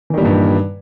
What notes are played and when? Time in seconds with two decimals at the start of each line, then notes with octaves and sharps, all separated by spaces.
0.10 E3
0.14 D#3
0.18 G3
0.21 A#2
0.25 G2